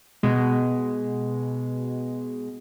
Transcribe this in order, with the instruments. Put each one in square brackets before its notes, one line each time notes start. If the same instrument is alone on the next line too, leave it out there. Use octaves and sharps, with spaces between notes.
[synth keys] B2 G#3